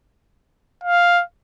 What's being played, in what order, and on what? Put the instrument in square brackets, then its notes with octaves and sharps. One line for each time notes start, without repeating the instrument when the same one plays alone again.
[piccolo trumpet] F5